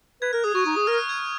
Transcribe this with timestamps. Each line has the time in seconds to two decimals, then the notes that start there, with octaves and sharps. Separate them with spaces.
0.22 B4 G#6
0.33 A#4 F#6
0.44 G#4 D#6
0.55 F#4 C#6
0.66 D#4 D#6
0.76 G#4 D#6
0.87 A#4 F6
0.98 F#6
1.09 G#6